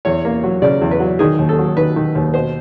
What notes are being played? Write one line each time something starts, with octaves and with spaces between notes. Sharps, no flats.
E2 C#5
A#3
F#3
C#3 D5
E2
B4
F#3
D#3 G#4
D#2
A4
F#3
D#3 B4
D#3
D#2
B2 C5